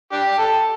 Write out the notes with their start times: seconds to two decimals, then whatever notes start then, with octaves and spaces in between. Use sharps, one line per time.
0.12 D4 G4
0.38 A4